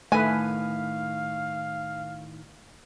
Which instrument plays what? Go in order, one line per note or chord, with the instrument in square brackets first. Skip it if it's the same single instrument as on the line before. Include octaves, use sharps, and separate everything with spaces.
[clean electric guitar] A2 D#3 [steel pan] A3 B4 [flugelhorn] F5 [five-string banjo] G#5